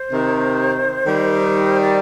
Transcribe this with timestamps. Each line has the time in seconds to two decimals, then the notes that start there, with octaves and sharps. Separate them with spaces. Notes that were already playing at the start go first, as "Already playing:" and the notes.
Already playing: C5
0.11 C3 D#3
1.06 D#3 G3
1.81 D5